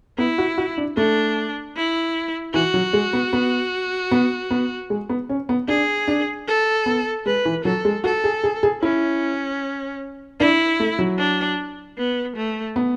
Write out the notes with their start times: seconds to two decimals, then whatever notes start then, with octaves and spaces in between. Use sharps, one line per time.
0.18 B3 E4
0.38 F#4
0.58 F#4
0.78 D4
0.97 A3 D4
1.76 E4
2.54 E3 F#4
2.74 F#3
2.93 G#3
3.13 B3
3.33 B3
4.11 B3
4.51 B3
4.90 G#3
5.09 B3
5.29 C#4
5.49 B3
5.68 D4 G#4
6.08 D4
6.48 A4
6.86 B3
7.26 G#3 B4
7.45 E3
7.65 F#3 A4
7.85 G#3
8.04 F#4 A4
8.24 G#4
8.44 G#4
8.63 G#4
8.82 C#4 E4
10.40 D4 E4
10.80 A3
10.99 F#3
11.18 D4
11.98 B3
12.36 A3
12.76 B3